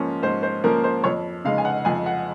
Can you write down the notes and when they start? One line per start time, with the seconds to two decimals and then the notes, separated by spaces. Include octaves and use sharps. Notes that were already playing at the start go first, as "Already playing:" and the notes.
Already playing: G#2 F3 A#3 C#4
0.22 G#2 C5
0.43 C5
0.64 F3 A#3 C#4 A#4
0.84 C5
1.04 F2 C#5
1.45 C#3 G#3 D#4 F5
1.58 G#5
1.65 F#5
1.85 F2 G#5
2.06 F#5